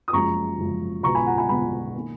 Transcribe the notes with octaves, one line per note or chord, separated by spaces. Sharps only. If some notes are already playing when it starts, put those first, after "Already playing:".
D#6
F#1 F#2 F3 G#3 A#5 C#6
F#1 F#2 F3 G#3
B1 B2 G#3 A#5 C#6
G#5 B5
F#5 A#5
G#5 B5
B1 B2 G#3 G#5 B5
D#3 A#3 D#4